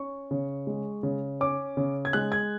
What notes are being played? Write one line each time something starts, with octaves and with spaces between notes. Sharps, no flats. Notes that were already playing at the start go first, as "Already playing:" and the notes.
Already playing: C#4 C#6
C#3
G#3
C#3
C#4 D6
C#3
G#6
G#3 F#6
G#6